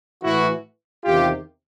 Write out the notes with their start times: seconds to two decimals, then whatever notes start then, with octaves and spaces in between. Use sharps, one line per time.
0.24 A2 E3 E4 F#4
1.04 E2 C3 D#3 F4 G4